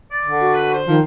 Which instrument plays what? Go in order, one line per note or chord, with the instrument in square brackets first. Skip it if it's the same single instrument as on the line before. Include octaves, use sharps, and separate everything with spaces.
[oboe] D5
[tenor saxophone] D3
[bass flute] F#4
[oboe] B4
C5
[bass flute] D#3 [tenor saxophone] F3